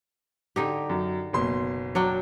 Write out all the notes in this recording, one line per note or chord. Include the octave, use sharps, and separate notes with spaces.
D3 D#4 G4
F#2
F#1 B2 C6
F#3 D4 G5